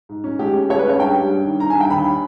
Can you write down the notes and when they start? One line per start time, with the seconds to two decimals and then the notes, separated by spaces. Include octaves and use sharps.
0.09 G#2
0.24 C#4
0.39 G#3 G4
0.54 C#4
0.69 G#3 C#5
0.79 B4
0.84 C#4
0.89 C#5
1.00 G2 G5
1.15 G3
1.30 G2
1.45 D#3
1.60 D#3 A#5
1.70 G#5
1.75 G2
1.80 G5
1.90 D#2 B5